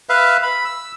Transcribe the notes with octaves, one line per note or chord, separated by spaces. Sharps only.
B4 E5 F5
B5
E6